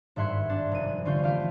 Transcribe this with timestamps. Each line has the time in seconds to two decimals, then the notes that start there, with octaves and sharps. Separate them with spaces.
0.16 G#1 G2 E5 F#5 C6 G#6
0.50 D4
0.72 F1 D#7
1.05 D3 G3 C#4 F4 F5 G6
1.23 E3 A3 G4 F5 F6 D7